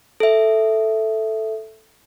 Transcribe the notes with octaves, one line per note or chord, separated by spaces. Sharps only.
A4 E5